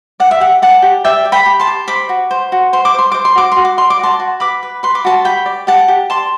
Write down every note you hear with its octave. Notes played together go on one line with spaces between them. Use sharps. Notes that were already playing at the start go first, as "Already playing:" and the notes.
D5 F#5
E5
G4 F#5
D5 F#5 A5
G4
D5 E5 G5
D5
G5 B5
G4
A5 C6
G4
C5 B5 D6
F#4
C5
F#4
C5 C6
D6
C5 C6
C5 D6
C6
F#4 D6
F#4 C6
D6
D5 C6
D6
F#4 A5 C6
F#4
B4 B5 D6
B4
B4 C6
D6
F#4 A5 C6
G4 G5 B5
D5
G4 F#5 A5
G4
D5 A5 C6